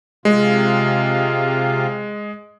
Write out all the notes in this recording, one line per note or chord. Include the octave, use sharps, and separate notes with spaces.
C3 G#3 F4